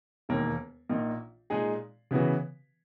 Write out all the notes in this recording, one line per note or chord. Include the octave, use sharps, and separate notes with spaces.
E1 D#2 D#3 A#3
A#1 A#2 A#3 D#4
A#2 G#3 D#4 G#4
C#3 E3 B3 F#4 B4